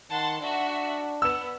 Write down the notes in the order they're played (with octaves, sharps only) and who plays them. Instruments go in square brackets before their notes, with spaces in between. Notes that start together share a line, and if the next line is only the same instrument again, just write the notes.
[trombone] D#3 [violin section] F#5 A5 C6
[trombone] D4 [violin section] F#4 E5
[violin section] B3 [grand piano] E6 E7